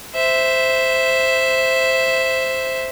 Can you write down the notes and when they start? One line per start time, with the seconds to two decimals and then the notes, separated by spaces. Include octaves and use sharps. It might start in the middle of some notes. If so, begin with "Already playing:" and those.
0.15 C5 E5